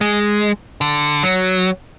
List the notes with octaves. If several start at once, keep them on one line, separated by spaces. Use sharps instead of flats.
G#3
D3
F#3